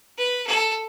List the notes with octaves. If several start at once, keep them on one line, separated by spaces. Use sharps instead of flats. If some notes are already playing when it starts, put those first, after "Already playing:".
B4
A4